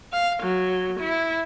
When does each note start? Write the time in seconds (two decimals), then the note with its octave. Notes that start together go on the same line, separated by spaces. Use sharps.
0.13 F5
0.43 F#3
1.00 E4